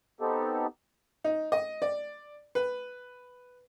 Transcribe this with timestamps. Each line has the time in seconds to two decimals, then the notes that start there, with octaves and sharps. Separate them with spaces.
0.21 B3 C4 D#4 G4 A4
1.24 D#4
1.52 D#5
1.82 D5
2.55 B4